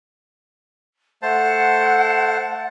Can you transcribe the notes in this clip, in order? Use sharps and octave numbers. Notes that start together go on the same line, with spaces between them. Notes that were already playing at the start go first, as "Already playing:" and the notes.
A3 C5 F#5 A5